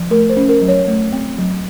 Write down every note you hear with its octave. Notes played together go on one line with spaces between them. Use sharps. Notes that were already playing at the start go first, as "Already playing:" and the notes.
Already playing: F3
A3 A#4
C5
C#4
A#4
F#3
C#5
A3
C4
F#3